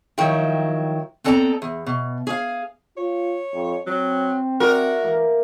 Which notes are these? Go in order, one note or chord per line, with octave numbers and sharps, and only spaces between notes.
D#3 F3 F#3 E4 G5
B3 C4 A4 D5 A5 A#5
E2
B2
G#4 F5
F4 C#5
F2
F#3 C4
F#4 A#4 D5 E5
E3 A#3